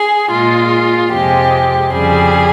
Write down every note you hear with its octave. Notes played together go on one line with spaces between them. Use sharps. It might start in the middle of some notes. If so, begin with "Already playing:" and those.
Already playing: G#4
A#2 G#3 F4
F2 C3 F3 G#3 G4
F2 C#3 G3 G#4